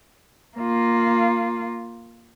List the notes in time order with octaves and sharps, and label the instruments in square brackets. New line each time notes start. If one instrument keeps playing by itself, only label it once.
[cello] A#3 F4